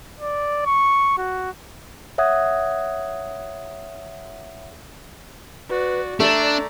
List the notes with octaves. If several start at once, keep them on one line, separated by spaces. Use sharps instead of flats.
D5
C#6
F#4
C#5 E5 F#5 D#6 F#6 G#6
F#4 B4 D5
A3 D4 D5 E5 A#5